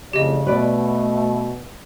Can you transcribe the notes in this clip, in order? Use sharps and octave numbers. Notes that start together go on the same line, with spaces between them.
F2 A2 C#3 G4 D5 D#5
B2 A3 B4 D5